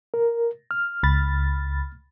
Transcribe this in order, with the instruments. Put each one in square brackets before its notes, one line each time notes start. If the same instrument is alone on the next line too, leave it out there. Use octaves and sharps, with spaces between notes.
[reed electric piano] A#4
F6
[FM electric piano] C#2 B5 A6